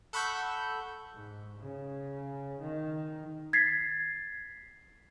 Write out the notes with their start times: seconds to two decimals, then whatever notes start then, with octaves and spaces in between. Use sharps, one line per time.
0.13 A4 F#5 B5 C#6 E6 G6
1.14 G#2
1.59 C#3
2.60 D#3
3.53 G#6 A6 B6 C7